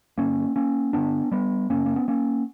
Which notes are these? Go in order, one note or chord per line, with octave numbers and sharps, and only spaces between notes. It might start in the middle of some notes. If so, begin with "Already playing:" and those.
G2 D3 A#3 C#4
A#3 C#4
G2 D3 B3 D4
G3 B3
F#2 C#3 A#3 C#4
A#3
B3
A#3 C#4